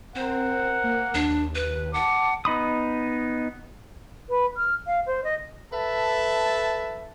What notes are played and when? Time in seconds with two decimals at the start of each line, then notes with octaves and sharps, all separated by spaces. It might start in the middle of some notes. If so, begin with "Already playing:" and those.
0.15 C4 A#4 C5 F#5
0.84 A#3
1.14 D#2 D4
1.55 B4
1.94 F#5 A5 D6
2.45 B3 D#4 B5 D#6
4.29 B4
4.57 F6
4.86 F5
5.06 C5
5.24 D#5
5.72 A4 B4 E5 A5